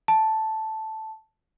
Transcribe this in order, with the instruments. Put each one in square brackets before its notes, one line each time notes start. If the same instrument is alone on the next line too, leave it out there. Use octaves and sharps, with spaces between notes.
[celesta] A5